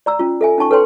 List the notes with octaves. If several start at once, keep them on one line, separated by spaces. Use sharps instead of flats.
D5 A#5 E6
C#4 F4
A4 E5 G#5
C#4 D#4 A5 C#6
A4 B4 C#5 G5 C6